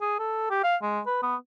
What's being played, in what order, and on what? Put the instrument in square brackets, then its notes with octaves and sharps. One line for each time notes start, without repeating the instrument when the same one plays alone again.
[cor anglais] G#4
A4
G4
F5
G#3
B4
B3